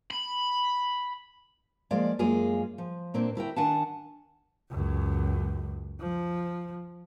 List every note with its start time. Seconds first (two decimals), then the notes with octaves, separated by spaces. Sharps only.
0.11 B5
1.91 F3 G#3 A#3 D5 F5
2.19 F#2 G#3 A#3 F4 G#4 G#5
2.78 F3
3.14 A#2 A#3 C4 D4
3.35 D2 E4 A#4 G5
3.56 D#3 D4 F#5 G#5 A5
4.71 C#2 F#2
6.01 F3